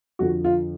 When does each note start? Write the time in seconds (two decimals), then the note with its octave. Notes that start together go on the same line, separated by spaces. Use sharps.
0.19 F2 D3 F3 F#4
0.45 F4